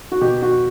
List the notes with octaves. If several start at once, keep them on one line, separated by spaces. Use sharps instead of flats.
F#4
B2 G4
F#4